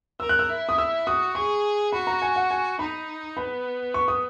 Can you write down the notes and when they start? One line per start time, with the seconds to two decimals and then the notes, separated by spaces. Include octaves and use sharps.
0.20 A#4 E6
0.29 F#6
0.39 E6
0.49 E4
0.69 D#6
0.78 E6
1.07 F#4 D#6
1.35 G#4 C#6
1.92 F#4 B5
2.07 A#5
2.22 G#5
2.36 F#5
2.51 G#5
2.79 D#4 B5
3.36 B3 B5
3.94 C#6
4.08 D#6